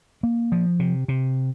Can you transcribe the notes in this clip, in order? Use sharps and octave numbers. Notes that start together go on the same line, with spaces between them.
A#3
F3
C3
C3